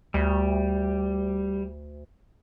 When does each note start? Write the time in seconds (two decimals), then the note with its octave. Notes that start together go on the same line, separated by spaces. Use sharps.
0.14 D2 G3